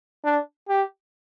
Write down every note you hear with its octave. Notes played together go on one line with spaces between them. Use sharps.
D4
G4